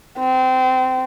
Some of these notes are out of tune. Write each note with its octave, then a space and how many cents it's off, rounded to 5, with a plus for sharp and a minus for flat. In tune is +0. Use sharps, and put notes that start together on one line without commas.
C4 -25